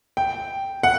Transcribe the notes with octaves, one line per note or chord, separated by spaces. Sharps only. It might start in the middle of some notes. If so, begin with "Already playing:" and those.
G5
F#5